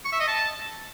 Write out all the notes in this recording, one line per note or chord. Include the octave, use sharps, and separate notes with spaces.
C#6
E5
D#5
A5